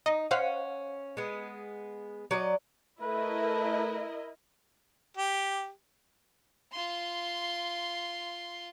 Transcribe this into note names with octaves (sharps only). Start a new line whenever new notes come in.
D#4 D#5
C#4 C5 F5 F#5
G#3 B3
F#3 D5 D#5
A3 E4 A#4 B4 D#5
G4
F4 C6